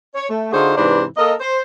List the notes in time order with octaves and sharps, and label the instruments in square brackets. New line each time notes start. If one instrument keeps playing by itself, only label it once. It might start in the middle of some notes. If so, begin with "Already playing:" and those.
[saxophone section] C#5
A3
D3 D#4 F4 F#4 G#4 C5
G#2 C3 E3 D4 B4 C5
A#3 A4 A#4 D#5
C5